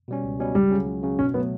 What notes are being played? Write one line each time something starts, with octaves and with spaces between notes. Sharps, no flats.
B2 G3 C#4
C#2
B2 G3 C#4
C#2 G3
C#3 F#3 C#4
C#2
C#3 F#3 C#4
B2 C#4
F#3 A3 B3